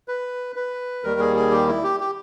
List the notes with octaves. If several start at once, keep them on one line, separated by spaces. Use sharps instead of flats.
B4
B4
D#2 D#3 G3 A#4
G#4
G#4
G4
E4
G4
G4